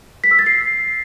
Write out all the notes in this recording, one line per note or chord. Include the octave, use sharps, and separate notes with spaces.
B6
E6
A6
C7